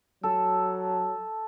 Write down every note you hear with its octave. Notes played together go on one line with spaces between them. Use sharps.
F#3 A4